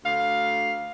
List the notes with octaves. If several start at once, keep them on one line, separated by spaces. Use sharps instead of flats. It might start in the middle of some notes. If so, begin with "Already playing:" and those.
D2 F5